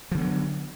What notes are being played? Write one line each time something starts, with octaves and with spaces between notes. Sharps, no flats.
D3 F3 F#3 B3